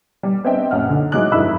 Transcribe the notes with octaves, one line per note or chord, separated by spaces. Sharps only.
G3
B3 C4 D4 D#5 E5 G5
A#1 F#2 F#5 F6
D3 D#4
A2 F#3 G#3 D#4 D6 F#6
F1 G2 D#4 E4 B5 E6